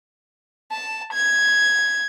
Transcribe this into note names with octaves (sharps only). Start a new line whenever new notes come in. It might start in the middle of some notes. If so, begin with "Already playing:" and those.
A5
G#6